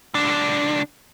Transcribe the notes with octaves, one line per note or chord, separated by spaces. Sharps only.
C#2 D4